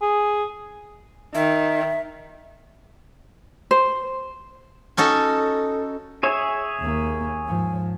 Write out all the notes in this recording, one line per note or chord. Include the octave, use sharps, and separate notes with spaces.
G#4
D#3 E5
C5
C#4 D#4 F#4 A4
G#4 C#5 E5
D#2 A#3
G#2 F3